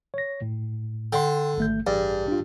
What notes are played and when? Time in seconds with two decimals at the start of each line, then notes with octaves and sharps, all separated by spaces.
0.14 C#5 A#6
0.42 A2
1.13 D3 G5 C6
1.58 G#1 A3 G6
1.87 A1 G2 G#4 D5
2.28 D4 F4